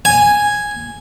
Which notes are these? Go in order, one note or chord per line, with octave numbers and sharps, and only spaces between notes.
G#5